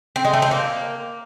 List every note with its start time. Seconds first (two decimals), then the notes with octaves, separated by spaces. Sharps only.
0.16 C4
0.25 G#3
0.33 A3
0.42 C4
0.51 A#3